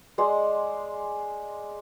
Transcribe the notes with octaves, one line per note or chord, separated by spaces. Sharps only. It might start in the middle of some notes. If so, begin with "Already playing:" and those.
G#3 C5 D5 C6